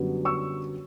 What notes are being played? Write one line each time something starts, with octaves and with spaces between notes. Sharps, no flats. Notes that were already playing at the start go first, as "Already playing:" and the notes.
Already playing: F#2 D3 G3 B3
C#6 E6